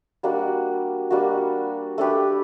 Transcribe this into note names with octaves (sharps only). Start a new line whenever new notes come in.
G3 A#3 D4 F#4
G3 A#3 D4 F#4
A3 D4 G4 B4